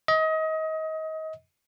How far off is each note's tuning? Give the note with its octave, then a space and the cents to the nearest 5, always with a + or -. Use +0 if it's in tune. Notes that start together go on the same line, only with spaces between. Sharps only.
D#5 +30